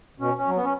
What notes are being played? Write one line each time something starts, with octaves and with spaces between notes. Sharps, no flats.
B2 C#4
C#4
F#3
B3
C#4